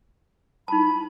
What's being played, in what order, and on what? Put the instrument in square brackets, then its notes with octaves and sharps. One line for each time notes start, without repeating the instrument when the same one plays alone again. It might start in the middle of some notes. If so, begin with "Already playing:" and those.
[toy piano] D#4 A5 [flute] B5